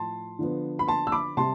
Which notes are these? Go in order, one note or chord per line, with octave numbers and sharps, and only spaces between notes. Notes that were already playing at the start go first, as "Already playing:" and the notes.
Already playing: A2 F3 A5 C6
D3 F3 B3
B5
A5 C6
E6
B5 D6
C3 G3 A5 C6